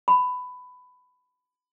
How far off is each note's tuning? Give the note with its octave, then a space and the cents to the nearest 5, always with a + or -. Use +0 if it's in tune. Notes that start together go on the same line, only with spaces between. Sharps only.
B5 +15